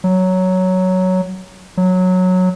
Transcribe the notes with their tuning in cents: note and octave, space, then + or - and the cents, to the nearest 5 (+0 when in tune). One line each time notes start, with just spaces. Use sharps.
F#3 +5
F#3 -10